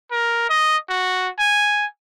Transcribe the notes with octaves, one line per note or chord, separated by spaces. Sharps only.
A#4
D#5
F#4
G#5